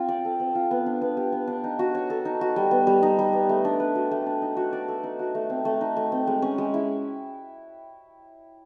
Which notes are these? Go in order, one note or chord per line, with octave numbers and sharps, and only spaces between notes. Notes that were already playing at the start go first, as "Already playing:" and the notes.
Already playing: C4 F4
D5
A4
C4
F4
B3
D4
B3
G4
B3
D4
D#4
F#4
C#5
A4
D#4
F#4
G3
B3
G3
D#4
G3
B3
A3
D4
B4
F#4
A3
D4
D#4
F#4
D5
A4
D#4
F#4
A3
C4
A3
D#4
A3
C4
G#3
C#4
G#3
E4